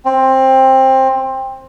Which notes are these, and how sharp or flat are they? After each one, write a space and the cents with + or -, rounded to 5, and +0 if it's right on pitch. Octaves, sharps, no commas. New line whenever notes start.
C4 +15